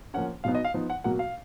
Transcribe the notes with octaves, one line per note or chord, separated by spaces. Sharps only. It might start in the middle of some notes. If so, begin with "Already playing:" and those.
F3 A#3 C#4 F#5
B2 F#3 B3 D#4 F5
D#5
F5
F3 B3 D#4
F#5
B2 F#3 A#3 F#5
F5